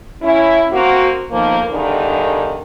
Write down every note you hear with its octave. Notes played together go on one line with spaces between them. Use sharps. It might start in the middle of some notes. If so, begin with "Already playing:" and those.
C#4 E4
A#3 C4 F#4
F2 D#3 F3 A#3 B3
E2 G2 D3 D#3